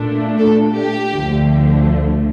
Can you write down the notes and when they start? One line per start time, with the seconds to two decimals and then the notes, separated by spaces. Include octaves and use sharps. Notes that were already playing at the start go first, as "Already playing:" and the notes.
Already playing: A#2 A3 D4
0.39 A4
0.76 G4
1.14 D2 D3 F3 A3